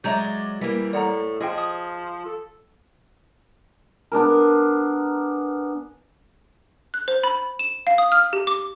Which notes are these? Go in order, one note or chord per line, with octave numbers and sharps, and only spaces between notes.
F#3 G#3 D5 E5 A#5 G6
E3 G3 A#3
A2 D5 F#5 A#5
F3 G#4 D#5 G5
D#6
A4
B3 D4 G#4 A#4
F#6
C5
B5
E7
F5
D#6
F6
G4
D6